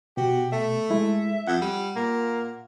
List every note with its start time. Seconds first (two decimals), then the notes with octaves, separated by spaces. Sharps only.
0.17 B2 F#4 G4
0.52 A3 E5
0.91 G#3 E4
1.47 F2 F#5
1.61 G3
1.96 A#2 A#3